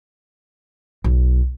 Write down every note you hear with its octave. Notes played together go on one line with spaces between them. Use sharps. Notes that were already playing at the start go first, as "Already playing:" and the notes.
B1